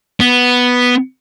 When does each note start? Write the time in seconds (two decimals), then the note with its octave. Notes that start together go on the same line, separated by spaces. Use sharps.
0.20 B3